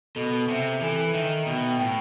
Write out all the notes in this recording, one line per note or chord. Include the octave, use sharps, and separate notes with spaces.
B2 A4
C3 E5
E3 A4
D#3 E5
B2 G5
A2 G5